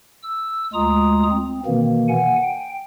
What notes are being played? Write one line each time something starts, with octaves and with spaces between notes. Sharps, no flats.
E6
D2 G#3 F4 A#5 D#6
C4
B2 D#3 E3 A#3
F#5 G#5
G5